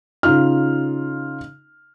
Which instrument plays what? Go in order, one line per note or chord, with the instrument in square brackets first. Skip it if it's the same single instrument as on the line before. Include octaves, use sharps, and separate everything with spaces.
[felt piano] C#3 D#4 F4 F6